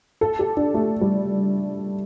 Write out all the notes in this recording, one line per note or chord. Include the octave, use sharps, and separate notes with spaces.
A4
G4
D4
A3
G3